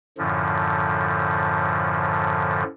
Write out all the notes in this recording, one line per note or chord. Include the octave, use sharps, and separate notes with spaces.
F#2 A2 D3 F3